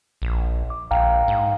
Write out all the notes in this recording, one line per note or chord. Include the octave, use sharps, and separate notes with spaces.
A#1
D6
A#1 F5 G5 A#5
G#2